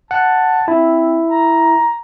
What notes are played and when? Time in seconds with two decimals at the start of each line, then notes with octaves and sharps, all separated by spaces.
0.11 F#5 A5
0.68 C4 E4
1.29 A#5